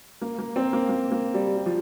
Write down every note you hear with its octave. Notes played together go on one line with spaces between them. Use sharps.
A#3
A#3
C4
A#3
A#3
A#3
G3
G3
F3